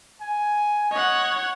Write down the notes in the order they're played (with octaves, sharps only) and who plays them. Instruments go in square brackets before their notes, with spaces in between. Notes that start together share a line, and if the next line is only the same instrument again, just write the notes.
[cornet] G#5
[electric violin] C#5 F#5 [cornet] D#5